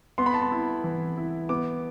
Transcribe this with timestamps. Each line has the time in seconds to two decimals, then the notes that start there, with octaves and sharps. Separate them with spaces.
0.18 B3 C6
0.26 B5
0.34 A5
0.42 B5
0.52 E4
0.84 E3
1.17 E4
1.49 B3 D6